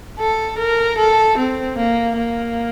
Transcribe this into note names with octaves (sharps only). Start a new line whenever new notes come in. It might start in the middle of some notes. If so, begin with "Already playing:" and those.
A4
A#4
A4
C4
A#3
A#3